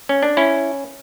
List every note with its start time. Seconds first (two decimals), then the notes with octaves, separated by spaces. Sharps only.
0.09 C#4
0.23 D4
0.37 C#4 E4